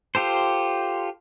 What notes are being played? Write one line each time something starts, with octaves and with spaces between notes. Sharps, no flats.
F4 G4 A4 C5